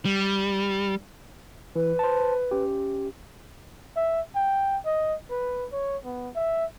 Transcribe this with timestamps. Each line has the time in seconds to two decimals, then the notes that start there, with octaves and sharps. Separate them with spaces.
0.05 G3
1.76 E3 B4
1.99 C5 A5
2.51 C#4 G4
3.96 E5
4.35 G5
4.86 D#5
5.30 B4
5.72 C#5
6.05 B3
6.36 E5